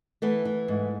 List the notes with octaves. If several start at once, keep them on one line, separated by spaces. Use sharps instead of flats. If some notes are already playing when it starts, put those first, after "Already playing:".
E3 A3 B3
E3
G#2